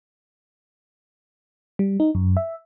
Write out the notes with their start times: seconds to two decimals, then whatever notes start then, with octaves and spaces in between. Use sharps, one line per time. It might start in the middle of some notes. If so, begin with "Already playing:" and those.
1.79 G3
2.00 D#4
2.15 F#2
2.37 E5